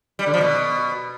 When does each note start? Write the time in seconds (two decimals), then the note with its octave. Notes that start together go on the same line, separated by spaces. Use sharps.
0.19 G3
0.26 D3
0.34 F3
0.41 B2